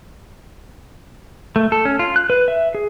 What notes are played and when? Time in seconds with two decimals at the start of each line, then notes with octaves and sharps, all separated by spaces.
1.56 A3
1.72 A4
1.85 C#4
1.99 F4
2.16 F#6
2.30 B4
2.48 E5
2.75 G#4